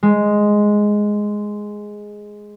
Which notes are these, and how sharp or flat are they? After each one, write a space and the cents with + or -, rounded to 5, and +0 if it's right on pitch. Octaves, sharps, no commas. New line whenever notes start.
G#3 +0